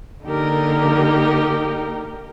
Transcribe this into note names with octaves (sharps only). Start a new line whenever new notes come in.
D3 A#3 D#4 G4 A#4